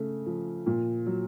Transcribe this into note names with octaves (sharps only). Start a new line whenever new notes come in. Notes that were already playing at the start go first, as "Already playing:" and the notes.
Already playing: C#3 A3
F3
A#2
F#3